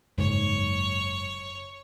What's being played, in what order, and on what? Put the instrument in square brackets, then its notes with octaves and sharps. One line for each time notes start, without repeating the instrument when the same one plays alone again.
[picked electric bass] F#1 G#2 [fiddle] C#5